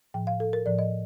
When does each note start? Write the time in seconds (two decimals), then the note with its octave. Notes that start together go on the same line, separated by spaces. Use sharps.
0.14 A2 F3 G5
0.27 F5
0.40 A4
0.53 A#4
0.66 A2 F3 D5
0.79 D#5